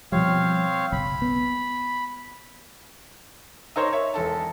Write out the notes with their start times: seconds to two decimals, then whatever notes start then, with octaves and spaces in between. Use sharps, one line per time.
0.12 B2 F3 G3 C4 C#5 F5
0.92 F#1 B1 B5
1.22 B3
3.76 D#4 A#4 C5 C#5
3.93 C#5 E5
4.14 E1 A4 A5